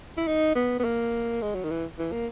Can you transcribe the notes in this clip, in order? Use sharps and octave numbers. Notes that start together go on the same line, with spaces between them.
E4
D#4
B3
B3
A#3
G#3
F#3
D#3
E3
E3
A#3